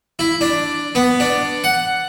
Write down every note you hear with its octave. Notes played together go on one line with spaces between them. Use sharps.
E4
D4
B3
D4
F#5